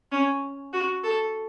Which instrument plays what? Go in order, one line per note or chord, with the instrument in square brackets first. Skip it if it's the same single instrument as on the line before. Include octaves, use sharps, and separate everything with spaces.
[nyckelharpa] C#4
F#4
A4